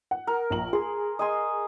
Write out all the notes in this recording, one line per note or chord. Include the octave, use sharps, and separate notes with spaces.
F#5
A#4
A#1 A#5 F#7
G#4 C6
D#5 G#5 C6